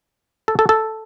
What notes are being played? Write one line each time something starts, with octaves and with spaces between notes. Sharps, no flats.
A4
A4
A4